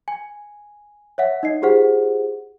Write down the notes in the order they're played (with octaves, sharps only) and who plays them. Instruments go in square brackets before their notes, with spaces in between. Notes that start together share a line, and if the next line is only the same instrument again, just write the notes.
[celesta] G#5
C#5 E5 F#5
D#4 D#5 C7
F4 G4 G#4 C5 F#5